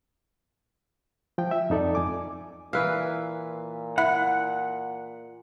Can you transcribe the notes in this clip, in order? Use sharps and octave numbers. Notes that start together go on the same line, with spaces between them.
F3 G5
E5
F2 D#4 A4 D5
F2 G#5 D6
A#2 E3 B4 E5 F5
E4 F#5